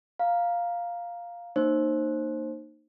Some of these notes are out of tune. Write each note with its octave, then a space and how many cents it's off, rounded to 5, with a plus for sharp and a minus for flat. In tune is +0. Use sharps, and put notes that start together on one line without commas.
F5 +0 A#5 +0
A#3 -10 D#4 -25 C5 +20